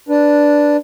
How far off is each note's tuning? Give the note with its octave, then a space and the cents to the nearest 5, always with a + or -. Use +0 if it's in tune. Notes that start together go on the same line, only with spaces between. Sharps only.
D4 +0 B4 -10